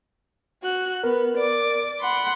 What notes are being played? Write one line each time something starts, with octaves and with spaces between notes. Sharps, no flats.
F#4 F#6
B3 A#4
D5 D6
F#5 B5 C6